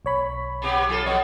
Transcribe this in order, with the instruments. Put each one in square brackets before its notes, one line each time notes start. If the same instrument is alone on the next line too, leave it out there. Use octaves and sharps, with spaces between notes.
[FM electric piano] B1 C#5 B5
[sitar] C3 B3 G4
F#3 F4 A4
[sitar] F3 B3 [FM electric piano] C#5 D#5